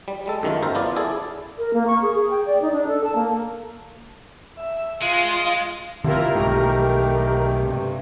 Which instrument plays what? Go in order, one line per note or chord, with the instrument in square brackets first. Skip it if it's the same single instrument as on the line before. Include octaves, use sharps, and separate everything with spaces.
[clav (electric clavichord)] G3
G3 G#3 A4
F#2 D#3 A3 F4
G1 A4 A#4 C5 E5
B3 E4 F4 D5
E4 G#4 A4 D5
[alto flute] A#4
A#3
C#6
G#4
G#4
G5
D5
D#4
D4
A4
A5
A#3
[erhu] E5
[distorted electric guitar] G#3 [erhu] F4
[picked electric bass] D3 C4 [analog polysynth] E4 F4 A#4 [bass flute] G4
[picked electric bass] B1 G#2 [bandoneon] D#3 A3 [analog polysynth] A#4
[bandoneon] G2 [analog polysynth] C3